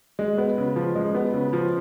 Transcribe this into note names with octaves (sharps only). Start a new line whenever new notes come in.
G#3
B3
C#3
F3
G#3
B3
C#3
F3